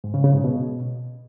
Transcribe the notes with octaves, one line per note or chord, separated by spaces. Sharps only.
G#2
C#3
C#3
G#2
B2